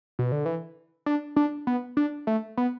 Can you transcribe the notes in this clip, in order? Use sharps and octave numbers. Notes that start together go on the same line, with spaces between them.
B2
D3
E3
D4
D4
B3
D4
A3
B3